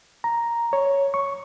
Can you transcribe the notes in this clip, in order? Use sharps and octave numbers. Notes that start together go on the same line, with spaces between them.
A#5
C#5
C#6